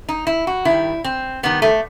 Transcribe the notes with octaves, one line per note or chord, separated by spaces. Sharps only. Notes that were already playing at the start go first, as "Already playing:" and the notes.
D#4
E4
F#4
D#3 G3 E4
C4
D#3 G3 B3
A3